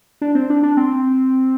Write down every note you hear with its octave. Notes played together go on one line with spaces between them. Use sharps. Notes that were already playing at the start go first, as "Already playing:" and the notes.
D4
C4
D4
D4
C4